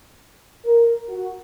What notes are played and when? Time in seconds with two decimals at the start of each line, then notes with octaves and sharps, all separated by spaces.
0.66 A#4
1.10 F#4